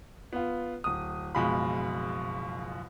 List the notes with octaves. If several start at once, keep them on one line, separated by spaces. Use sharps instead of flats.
B3 F4
D1 D#6
F#1 B2 F3 G#3 F4 B5